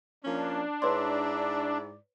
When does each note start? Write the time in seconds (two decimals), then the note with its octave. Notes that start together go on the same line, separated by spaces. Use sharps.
0.24 F3 A#3 C#4 D4
0.82 G#2 E4 B4 C#5 D5 C6